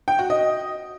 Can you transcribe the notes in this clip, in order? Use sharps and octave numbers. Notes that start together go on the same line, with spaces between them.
G5
F#4
D#5